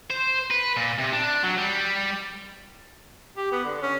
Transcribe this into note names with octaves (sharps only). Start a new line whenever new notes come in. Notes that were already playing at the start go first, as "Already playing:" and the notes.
C5
B4
A#2
C3
D4
F#3
G3
G4
B3
D3
C#4